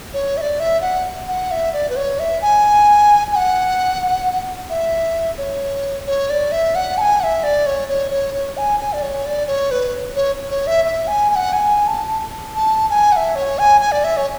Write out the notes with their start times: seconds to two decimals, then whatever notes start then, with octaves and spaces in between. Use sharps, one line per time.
0.14 C#5
0.37 E5
0.41 D5
0.60 E5
0.82 F#5
1.28 F#5
1.51 E5
1.73 D5
1.89 B4
1.96 C#5
2.19 E5
2.42 G#5
3.32 G#5
3.36 F#5
4.70 E5
5.38 C#5
6.06 C#5
6.30 D5
6.52 E5
6.75 F#5
6.98 A5
7.01 G#5
7.20 F#5
7.23 E5
7.43 D5
7.66 C#5
7.89 C#5
8.11 C#5
8.35 C#5
8.57 G#5
8.80 G#5
8.93 D5
9.02 C#5
9.26 D5
9.47 C#5
9.71 B4
10.16 C#5
10.50 C#5
10.67 E5
10.85 E5
11.07 G#5
11.31 G#5
11.36 F#5
11.53 G#5
11.87 A5
12.55 A5
12.90 G#5
13.12 F#5
13.16 E5
13.35 C#5
13.59 G#5
13.81 G#5
13.92 D5
14.04 E5
14.17 C#5